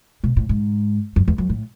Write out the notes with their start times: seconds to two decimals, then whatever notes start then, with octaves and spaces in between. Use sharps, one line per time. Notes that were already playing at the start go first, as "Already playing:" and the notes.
0.24 B2
0.37 A2
0.49 G#2
1.16 F#2
1.28 E2
1.38 F#2
1.49 A2